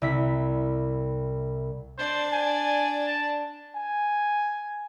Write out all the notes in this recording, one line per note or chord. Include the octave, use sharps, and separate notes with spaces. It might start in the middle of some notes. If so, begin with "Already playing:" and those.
C2 E4 B6
D4 C5 D5
G#5
A5
G#5